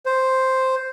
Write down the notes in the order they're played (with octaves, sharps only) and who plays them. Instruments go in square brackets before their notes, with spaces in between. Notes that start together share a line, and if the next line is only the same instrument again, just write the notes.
[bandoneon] C5